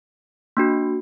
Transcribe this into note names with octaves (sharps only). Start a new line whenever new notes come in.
A#3 D4 F#4